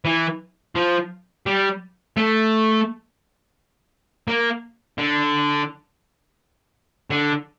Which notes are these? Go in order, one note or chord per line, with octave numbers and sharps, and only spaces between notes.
E3
F3
G3
A3
A#3
D3
D3